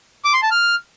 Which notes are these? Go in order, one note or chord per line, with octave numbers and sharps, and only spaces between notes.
D6
C6
A5
F6